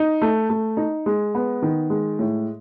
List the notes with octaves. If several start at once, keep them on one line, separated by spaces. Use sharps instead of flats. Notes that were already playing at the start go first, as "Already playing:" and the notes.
Already playing: D#4
A3
A3
D#4
G#3
B3
D#3
G#3
A2